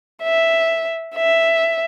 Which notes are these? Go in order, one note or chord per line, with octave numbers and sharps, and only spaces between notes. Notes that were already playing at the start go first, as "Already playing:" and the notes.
E5
E5